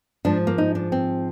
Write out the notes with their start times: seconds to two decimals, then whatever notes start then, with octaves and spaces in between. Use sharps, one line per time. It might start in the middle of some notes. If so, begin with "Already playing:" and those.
0.25 G#2 F3 D4
0.47 A#3
0.58 D#4
0.75 D4
0.92 C4